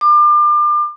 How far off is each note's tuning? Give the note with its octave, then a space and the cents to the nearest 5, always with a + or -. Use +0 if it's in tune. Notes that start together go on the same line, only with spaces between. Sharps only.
D6 +35